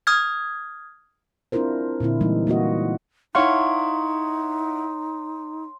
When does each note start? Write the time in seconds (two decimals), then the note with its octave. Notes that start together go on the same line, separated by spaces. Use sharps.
0.07 D#6 F6 G#6
1.52 C4 D4 E4 F4 A#4 C5
2.00 A#2 D3 C4 E4
2.21 E3 G3 G#3 A#3 D#4
2.47 A#3 F4 F#4 D#5
3.35 D#4 E4 C#5 F5 F#5 C6